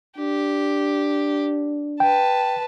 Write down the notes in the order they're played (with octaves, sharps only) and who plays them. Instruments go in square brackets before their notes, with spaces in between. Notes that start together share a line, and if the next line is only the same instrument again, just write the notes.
[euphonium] D4 [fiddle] G4
[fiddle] B4 A5 [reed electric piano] G5